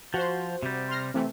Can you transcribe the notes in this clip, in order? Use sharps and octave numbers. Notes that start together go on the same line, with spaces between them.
F3 F#4 C5
C3 G3
C6 F6 A#6
C3 E3 A3